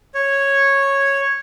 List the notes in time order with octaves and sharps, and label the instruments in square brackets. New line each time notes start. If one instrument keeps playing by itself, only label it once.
[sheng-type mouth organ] C#5